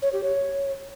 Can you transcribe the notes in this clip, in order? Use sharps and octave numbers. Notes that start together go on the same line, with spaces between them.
C#5
G4
C#5